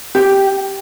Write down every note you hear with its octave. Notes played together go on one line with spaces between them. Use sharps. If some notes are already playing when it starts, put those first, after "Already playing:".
G4